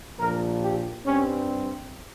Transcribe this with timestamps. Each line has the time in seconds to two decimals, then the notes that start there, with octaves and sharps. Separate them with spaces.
0.19 A#1 A#2 F3 A#4
0.62 G4
1.05 G2 G3 C4 C#4